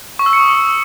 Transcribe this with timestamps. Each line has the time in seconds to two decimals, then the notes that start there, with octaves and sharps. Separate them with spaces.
0.19 C#6
0.26 E6
0.33 C#7
0.40 D#6